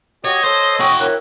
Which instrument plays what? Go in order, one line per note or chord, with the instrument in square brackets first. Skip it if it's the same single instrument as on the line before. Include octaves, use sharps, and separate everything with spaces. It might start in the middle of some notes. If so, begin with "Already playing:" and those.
[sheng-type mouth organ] F#4 G4 [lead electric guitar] C#5 [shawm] D#5
[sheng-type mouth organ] A4 C#5 E6 [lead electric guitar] C5
[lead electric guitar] F#4 G5 [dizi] C#6
[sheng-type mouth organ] E4 A#4 C#5 [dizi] F#6